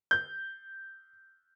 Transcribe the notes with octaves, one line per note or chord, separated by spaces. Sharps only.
G6